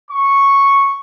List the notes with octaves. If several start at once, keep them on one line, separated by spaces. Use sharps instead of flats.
C#6